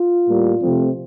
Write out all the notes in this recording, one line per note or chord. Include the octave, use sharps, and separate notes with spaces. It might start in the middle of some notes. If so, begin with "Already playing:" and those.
Already playing: F4
A2 G3 A#3
C3 F3 A3 C4